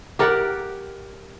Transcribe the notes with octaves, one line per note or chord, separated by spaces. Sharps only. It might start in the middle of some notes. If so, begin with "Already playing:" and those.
G4 A#4 D5 F#5